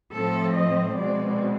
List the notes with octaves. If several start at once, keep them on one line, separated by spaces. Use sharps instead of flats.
A2 F3 A3 C4 A4
D#5
B2 G#3 C4 D5